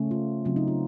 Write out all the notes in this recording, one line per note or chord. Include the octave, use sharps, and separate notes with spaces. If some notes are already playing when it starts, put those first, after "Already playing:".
Already playing: C#3 A3 C#4
F4
C#3 F#3 C4 F4
D#4
F4